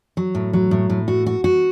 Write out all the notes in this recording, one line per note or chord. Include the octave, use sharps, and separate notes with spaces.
F#3
A2
F#3
A2
A2
F#4
F#4
F#4